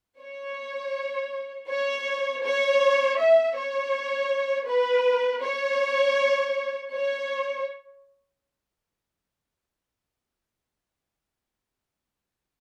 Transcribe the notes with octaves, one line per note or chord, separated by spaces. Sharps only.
C#5
C#5
C#5
E5
C#5
B4
C#5
C#5